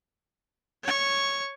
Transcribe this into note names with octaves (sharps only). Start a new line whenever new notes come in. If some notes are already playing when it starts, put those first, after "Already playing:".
C#5 C#6